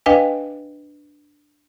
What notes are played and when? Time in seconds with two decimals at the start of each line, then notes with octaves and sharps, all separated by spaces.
0.06 D4 B4 D#5 F5 G5 G#5